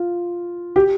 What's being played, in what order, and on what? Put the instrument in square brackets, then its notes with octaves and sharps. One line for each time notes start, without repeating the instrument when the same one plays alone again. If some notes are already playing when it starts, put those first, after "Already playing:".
Already playing: [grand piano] F4
G4